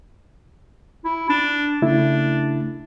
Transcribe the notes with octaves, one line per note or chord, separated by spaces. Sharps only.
E4
D4
C#3 A3 D4 E4